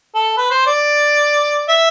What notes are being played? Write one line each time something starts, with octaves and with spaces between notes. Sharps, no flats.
A4
B4
C5
D5
E5